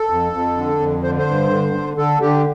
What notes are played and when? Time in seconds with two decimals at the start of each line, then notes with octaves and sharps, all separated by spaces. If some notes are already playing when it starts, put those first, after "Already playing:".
Already playing: A4
0.10 F2
0.33 F2
0.57 D3
0.80 F2
1.03 D3 C5
1.18 C5
1.27 G2
1.51 D3
1.74 D3
1.97 D3 A4
2.21 D3 G4